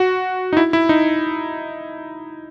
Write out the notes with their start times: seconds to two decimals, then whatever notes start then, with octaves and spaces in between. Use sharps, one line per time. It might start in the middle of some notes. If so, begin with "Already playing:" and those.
Already playing: F#4
0.53 D#4
0.57 E4
0.73 E4
0.89 D#4